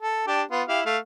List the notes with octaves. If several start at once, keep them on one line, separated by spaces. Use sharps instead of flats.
A4
D4 G4
B3 F4
E4 G4 F5
A3 F5